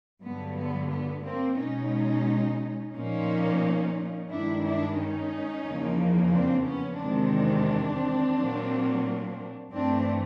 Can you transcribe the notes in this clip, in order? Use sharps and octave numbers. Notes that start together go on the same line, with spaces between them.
G2 D3 F#3 B3
B3
B3
A#3 C4
B2 G#3 C#4 D#4
A#2 F3 A#3 C#4 D#4
G2 D#3 G#3 D4 E4
D4 E4
C#4 D#4
E2 C#3 F3 A#3
C4 D4
B3 C#4
E2 C3 D#3 G#3 C4 D4
A#2 F#3 A#3
G2 E3 A3 C4 D4